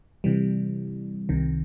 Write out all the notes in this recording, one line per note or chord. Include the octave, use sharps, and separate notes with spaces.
C3 E3 G3
C2 C3 D#3